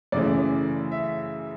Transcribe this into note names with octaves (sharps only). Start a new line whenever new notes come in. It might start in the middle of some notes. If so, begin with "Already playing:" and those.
F#2 C#3 E3 A3 D5
E5